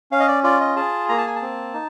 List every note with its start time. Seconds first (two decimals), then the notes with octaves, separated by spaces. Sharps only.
0.12 C#4 F5
0.20 D#5
0.28 D5
0.44 F4 D5
0.60 D#5
0.76 G#4 A5
1.09 A#3 A#5
1.18 A5
1.27 G#5
1.35 A5
1.42 C4
1.74 D#4